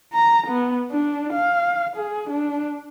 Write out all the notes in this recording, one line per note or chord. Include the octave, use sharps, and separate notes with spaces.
A#5
B3
D4
F5
G#4
D4